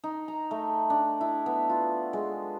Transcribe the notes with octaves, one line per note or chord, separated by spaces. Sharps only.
D#4
A#5
A3
D4
E4
B3
F4
G#3